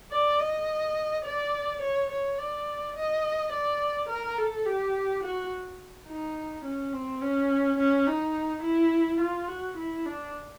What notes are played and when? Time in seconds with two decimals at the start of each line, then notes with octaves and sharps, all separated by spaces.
0.11 D5
0.39 D#5
1.25 D5
1.81 C#5
2.10 C#5
2.38 D5
2.96 D#5
3.52 D5
4.09 A#4
4.38 A4
4.65 G4
5.23 F#4
6.08 D#4
6.64 C#4
6.93 C4
7.21 C#4
7.78 C#4
8.07 D#4
8.63 E4
9.20 F4
9.48 F#4
9.77 E4
10.06 D4